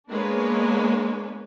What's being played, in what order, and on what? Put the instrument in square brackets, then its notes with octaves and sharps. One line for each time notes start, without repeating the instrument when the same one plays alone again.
[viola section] G#3 A#3 B3 D4 B4 C#5